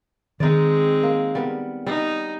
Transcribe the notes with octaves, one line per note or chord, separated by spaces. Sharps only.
D#3 G#3 C4 D#4 D5
A#3
G3 B3 A#4
G3 D#4